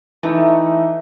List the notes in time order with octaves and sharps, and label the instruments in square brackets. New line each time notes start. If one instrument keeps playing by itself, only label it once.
[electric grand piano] E3 D#4 [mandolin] A3